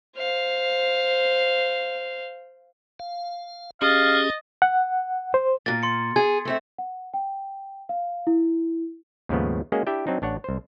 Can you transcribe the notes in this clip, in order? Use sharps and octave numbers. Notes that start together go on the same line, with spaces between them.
C5 F5
F5
C#4 G4 G#4 D#5 F5 A6
F#5
C5
A#2 A#3 A6
C6 C#7
G#4 G#6
A3 C4 E5
F#5
G5
F5
E4
D#2 G#2 C#3 F3 A3 B3
G#3 A#3 C#4 F#4 G#4 D#5
D4 E4 G4 E5 G5 A5
F#3 C4 D4 D#4
A1 D4 C#5 F#5
C2 C5